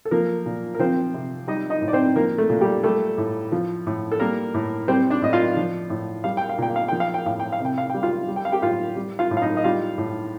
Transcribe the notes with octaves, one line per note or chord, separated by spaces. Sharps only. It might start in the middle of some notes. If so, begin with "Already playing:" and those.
A4
F3 A#3 A#4
A#2
A#4
F3 C4 C5
C3
G3 D#4 D#5
D#4 D#5
A2
D5
C4 C5
F3 A#3 A#4
A3 A4
A#2
G3 G4
G3 A3 A4
A2
F3
A2
A4
G3 A#3 A#4
A2
G3 C4 C5
D4 D5
A2 D#5
F4 F5
F3
A2
G3 F5
G5
F5
A#2 G5
F5
F3 G5
F5
G5
A2 F5
G5
F5
C3 G5
F5
G3 G5
F4 F5
G3
G5
F5
G4 G5
A2 F4 F5
G3
F4 F5
A2
F5
D#4 D#5
D#5
G3 F4 F5
A2